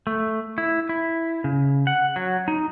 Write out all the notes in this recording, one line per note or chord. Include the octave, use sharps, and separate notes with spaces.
A3
E4
E4
C#3
F#5
F#3
D#4